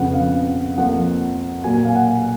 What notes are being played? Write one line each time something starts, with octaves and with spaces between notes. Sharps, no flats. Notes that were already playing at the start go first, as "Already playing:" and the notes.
Already playing: F2 C#3 F3 B3 F#5
F5
F2 F3 A#3 F#5
A#2 F#3 A#3 G#5
G#5
F5
F#5